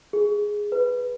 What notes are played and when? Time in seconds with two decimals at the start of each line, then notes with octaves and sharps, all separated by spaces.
0.13 G#4
0.72 B4